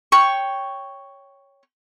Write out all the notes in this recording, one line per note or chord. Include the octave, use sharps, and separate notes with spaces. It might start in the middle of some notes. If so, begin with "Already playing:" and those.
C#5 G5 C#6